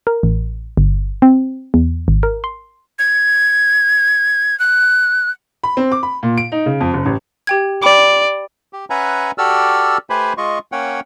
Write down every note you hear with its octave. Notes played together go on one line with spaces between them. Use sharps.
A#4
A1
G1
C4
E2
G#1
A#4
C6
G#6
F#6
B5
C4
D6
B5
A#2
D7
D#4
C#3
F2
F#1
A1
G4 G5 G#6
D5 G5 B5 D6
G4
C#4 B4 E5 F#5 G#5 A#5
F#4 G4 A4 D5 E6 F6
A3 G4 B4 C5 G#5 B5
G#3 F4 D#5 C#6
A#3 C#4 C#5 F#5 G5